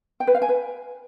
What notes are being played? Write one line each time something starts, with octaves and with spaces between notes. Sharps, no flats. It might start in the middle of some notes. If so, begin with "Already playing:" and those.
G5
B4
F5
G#5
B4